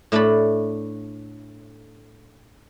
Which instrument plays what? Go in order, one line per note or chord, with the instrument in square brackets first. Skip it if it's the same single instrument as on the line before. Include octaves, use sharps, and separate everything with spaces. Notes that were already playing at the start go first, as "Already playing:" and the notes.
[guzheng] A2 A3 D4 A5 B5